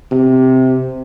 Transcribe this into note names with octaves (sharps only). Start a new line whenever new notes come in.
C3